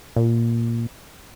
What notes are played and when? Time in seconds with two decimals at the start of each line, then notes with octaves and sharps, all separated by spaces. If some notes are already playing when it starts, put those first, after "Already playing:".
0.16 A#2